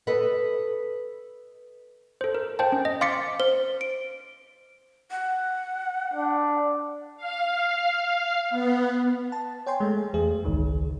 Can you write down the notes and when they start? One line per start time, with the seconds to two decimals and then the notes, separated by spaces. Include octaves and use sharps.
0.07 A4 B4 D#5
2.21 A4 C5
2.35 A#4
2.59 C5 F5 G5 A5
2.72 C#4
2.85 D#5
3.01 F5 C6 D6 A6 B6 C#7
3.40 C5
3.81 D7
5.11 F#5
6.14 D4
7.17 F5
8.50 B3
9.32 A5
9.66 C#5 G5 G#5 C6
9.80 G#3 A3
10.14 E2 G#4
10.45 G#1 C#2 D#3